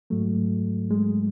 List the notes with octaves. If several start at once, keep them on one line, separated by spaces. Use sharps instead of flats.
G#2 F#3 A3
G#3